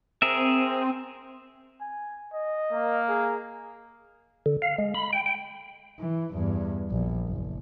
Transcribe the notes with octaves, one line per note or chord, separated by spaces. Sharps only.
C4 G#4 A#4 E5
G#5
D#5
A#3 A#4
G#4
D3
F5
G#3
B5
G5
G5
E3
E2 G2
A#1
F#1